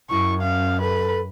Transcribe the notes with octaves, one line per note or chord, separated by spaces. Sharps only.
F#2 E4 C#6
C#4 F5
A4 B4